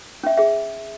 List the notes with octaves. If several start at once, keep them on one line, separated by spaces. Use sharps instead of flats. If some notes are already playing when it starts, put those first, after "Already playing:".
C#4 E5
G#4 E5